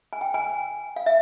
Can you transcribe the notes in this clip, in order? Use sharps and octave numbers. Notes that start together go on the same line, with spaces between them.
G#5
G5
G#5
F5
E5